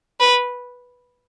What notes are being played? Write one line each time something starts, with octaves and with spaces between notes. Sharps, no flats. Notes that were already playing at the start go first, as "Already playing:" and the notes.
B4